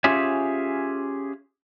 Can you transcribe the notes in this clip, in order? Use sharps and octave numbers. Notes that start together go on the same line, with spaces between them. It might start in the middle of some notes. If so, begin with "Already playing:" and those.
C#4 F4 G4 G#4 C#5 E5